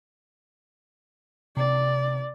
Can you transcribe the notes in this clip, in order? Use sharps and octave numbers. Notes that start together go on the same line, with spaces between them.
C3 D5